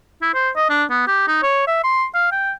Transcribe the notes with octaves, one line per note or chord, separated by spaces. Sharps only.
E4
C5
D#5
D4
B3
G4
D#4
C#5
E5
C6
F5
G5